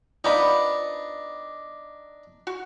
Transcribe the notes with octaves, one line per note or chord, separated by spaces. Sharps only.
F3 B3 D4 D#4 B5
F#4